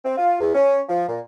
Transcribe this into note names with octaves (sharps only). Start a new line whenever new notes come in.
C4
F4
E2
C#4
F3
A#2